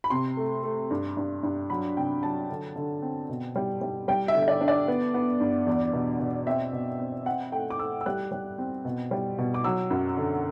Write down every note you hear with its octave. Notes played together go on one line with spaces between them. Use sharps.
B5
C3 C6
A3
A3
G2
G2
G2
F#3 B5
C3 G5
F#3 A5
D3
D3
C4
B2
G3
G3
G3 G5
E5
D3
E5
D5
D4
D5
B3
B3
G2
E2
B2
B2
C4 E5
B2
C4
C4 F#5
A3 G5
D6
A3 E6
E6
G3 F#6
G3
C4
B2
G3
B2
D6
F#3 E6
F#2
D3